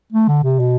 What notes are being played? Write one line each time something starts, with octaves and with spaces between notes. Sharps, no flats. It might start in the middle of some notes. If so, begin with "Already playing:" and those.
A3
D3
C3
B2